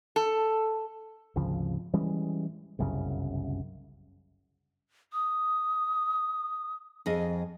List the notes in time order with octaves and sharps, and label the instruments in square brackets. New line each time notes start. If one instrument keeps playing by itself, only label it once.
[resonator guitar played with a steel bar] A4
[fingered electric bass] G#1 D2 C#3 F3
E3 G3 G#3 C#4
G1 C2 F#2 C#3
[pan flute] D#6
[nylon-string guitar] F2 G#4 D#5